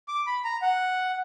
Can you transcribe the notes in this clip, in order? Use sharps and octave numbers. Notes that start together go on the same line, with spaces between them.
D6
B5
A#5
F#5